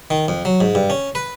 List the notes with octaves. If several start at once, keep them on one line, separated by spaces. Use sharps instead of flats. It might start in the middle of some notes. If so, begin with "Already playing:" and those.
D#3
F2
F#3
G#2
G2
C#4
B4